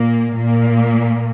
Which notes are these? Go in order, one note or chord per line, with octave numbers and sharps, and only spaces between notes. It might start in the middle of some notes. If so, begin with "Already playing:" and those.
Already playing: A#2 A#3
A#2 A#3